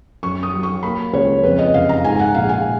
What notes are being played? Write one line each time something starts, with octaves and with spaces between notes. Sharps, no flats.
F#2 C#6
D#6
F#3
C#6
A#3 B5
C#2 C#5
F2 B4
D#5
F#1 F5
A#5
G#2 G#5
F#5
A#1 F5
G#5